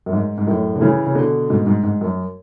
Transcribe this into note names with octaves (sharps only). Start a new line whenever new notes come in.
F#2
G#2
G#2
F#2 A2
D3
C#3 E3
C#3
B2 D3
G#2 B2
G#2
G#2
F#2